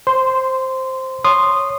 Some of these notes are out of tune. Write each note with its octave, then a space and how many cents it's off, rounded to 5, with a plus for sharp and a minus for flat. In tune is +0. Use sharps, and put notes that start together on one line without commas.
C5 +5 C6 -15
C#5 -5 C6 +0 D#6 -15